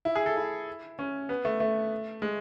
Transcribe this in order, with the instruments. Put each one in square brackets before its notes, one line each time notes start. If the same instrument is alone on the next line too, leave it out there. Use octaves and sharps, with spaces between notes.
[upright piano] E4
G#4
A4
E4
C#4
B3
A3
A3
G#3